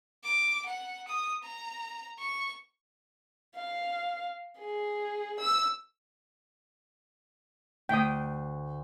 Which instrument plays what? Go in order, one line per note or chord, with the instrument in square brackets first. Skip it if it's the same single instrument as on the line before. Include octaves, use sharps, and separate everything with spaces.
[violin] D6
F#5
D#6
A#5
C#6
F5
G#4
E6
[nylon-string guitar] D2 [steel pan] G5 D#6